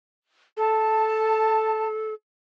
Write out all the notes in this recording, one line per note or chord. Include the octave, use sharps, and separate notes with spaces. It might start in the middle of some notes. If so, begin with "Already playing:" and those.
A4 A5